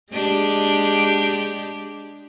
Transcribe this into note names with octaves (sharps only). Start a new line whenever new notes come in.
G#3 D4 G4